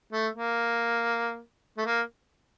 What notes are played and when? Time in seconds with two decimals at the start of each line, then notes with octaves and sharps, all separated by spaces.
0.12 A3
0.34 A#3
1.77 A3
1.86 A#3